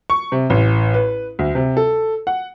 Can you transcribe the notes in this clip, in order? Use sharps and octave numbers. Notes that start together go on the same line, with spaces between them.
C#6
C3
A1
B4
D2
C3
A4
F#5